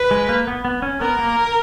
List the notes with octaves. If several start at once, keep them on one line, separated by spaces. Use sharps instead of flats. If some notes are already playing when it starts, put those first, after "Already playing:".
Already playing: B4
G#3
A#3
B3
B3
C#4
B3 A#4
A#3